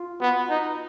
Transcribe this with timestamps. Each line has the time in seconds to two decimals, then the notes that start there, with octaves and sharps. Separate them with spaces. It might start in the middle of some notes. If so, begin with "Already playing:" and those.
Already playing: F4
0.21 B3 F#4
0.50 D#4